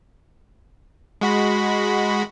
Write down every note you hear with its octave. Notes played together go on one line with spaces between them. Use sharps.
G#3 F#4 B5